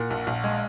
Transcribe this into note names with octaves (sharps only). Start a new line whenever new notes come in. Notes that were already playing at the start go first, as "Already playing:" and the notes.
Already playing: A#2 F#5
A#1
A#1
G#3